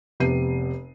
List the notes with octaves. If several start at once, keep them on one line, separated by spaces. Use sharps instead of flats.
F1 C3 B3 G4 C7 D#7